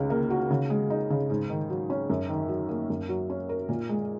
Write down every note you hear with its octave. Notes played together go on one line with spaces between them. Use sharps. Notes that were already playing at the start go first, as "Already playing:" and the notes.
Already playing: C#2 C#3
A#3
F#4
C#3
G#3
D#4
C#3
G#2
D#3
F#3
C#4
F#2
D#3
F#3
A#3
F#2
F#3
C#4
A#4
A#2
G#3